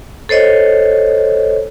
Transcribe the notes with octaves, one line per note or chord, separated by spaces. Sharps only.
A4 C5 C#5 D#5